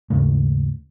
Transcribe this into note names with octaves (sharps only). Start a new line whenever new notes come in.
D#2 G#2 C#3 A3